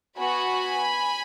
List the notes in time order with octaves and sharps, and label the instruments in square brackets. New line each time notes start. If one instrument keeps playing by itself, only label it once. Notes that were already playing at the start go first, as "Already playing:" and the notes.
[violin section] B3 F#4 G#5 B5